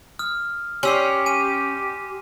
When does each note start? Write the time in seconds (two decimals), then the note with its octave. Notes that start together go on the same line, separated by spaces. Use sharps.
0.19 D#6 F6
0.83 C#4 G4 C6 E6 C7
1.26 G#5 D#7